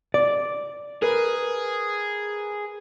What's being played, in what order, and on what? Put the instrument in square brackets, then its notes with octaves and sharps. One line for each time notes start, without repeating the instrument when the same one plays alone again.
[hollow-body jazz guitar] D5
[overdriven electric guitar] G#4 [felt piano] A#4 B4